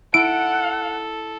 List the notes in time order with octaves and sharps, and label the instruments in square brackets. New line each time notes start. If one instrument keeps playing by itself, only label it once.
[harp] E4 [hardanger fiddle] A4 [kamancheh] F#5 [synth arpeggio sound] D7